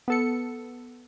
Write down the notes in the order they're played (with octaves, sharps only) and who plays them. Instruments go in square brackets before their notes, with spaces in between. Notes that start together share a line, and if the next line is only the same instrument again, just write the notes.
[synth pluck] B3 A4 C#7